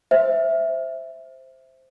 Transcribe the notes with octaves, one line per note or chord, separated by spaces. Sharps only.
C5 E5